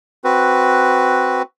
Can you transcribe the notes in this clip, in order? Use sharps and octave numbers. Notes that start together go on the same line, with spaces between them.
C4 F#4 B4